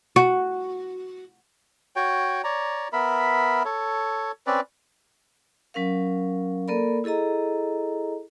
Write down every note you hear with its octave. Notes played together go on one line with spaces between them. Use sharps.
F#4
F#4 C#5 G5
C#5 D5 A#5
B3 A#4 E5 B5
A4 C#5
C4 C#4 B4 D5
F#3 C#4 A#4 F5
A#3 A4 A#4 D5 B5
E4 G#4 A4 D#5 A#5